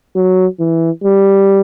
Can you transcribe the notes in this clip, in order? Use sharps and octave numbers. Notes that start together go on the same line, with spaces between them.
F#3
E3
G3